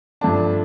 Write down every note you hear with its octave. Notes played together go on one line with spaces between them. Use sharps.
G2 F3 A3 D4 A5